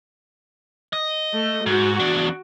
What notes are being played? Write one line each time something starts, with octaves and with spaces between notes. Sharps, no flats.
D#5
A3
G#2 F#4
E2 D4